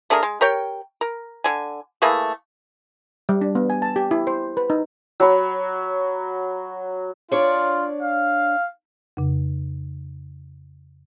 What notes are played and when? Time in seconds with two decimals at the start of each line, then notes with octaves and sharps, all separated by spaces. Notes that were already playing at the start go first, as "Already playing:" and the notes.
0.10 A3 D4 G#4 A#4
0.23 G#3
0.41 G4 A#4 C#5 G5
1.01 A#4
1.44 D3 G#5
2.02 E3 A3 A#3 G#4
3.29 G3
3.41 D4
3.55 B3
3.70 G#5
3.82 A5
3.96 G4
4.11 E4
4.27 C5
4.57 B4
4.70 D#4
5.20 F#3 B5
7.31 D4 F4 C#5 D5
8.02 F5
9.17 F2 C#3